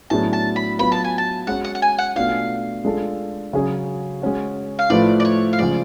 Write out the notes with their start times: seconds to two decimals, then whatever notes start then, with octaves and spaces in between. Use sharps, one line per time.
0.10 A2 F#3 B3 D4 G#4 A5
0.33 A5
0.56 B5
0.79 F#3 B3 F4 B4 B5
0.92 A5
1.04 G#5
1.18 A5
1.47 G#3 C#4 F#4 F#5
1.65 F#5
1.75 F#5
1.82 G#5
1.98 F#5
2.16 B2 A3 D4 F4 F5
2.85 G#3 D4 F4 A4
3.53 C#3 F#3 C#4 G#4
4.22 G#3 C#4 F#4
4.79 F5
4.90 A2 F3 A3 F4 B4 D5
5.20 D5
5.25 C#5
5.53 F5
5.59 C#3 F3 G#3 D5